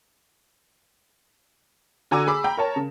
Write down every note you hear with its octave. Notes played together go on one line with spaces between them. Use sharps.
D3 F#4 G#5 A#5 D6 E6
G#4 B5 D6 E6
G5 A#5 B5
A#4 C#5 A5
C#3